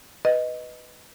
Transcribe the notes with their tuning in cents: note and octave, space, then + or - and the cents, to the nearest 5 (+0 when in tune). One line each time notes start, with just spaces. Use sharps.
B4 +10 D#5 +0